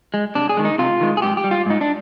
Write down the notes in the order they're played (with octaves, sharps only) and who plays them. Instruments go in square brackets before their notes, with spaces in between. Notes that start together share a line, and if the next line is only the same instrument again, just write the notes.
[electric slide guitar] G#3
C3 D4
G#4
D#3 G#3
D#4
C3 F4
D#3 G#3
G#4
G#2 G4
G4
G3
F4
G#2 D#4
D4